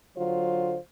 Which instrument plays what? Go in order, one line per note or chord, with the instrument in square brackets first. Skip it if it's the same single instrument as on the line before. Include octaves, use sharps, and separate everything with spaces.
[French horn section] D3 F#3 F4 C5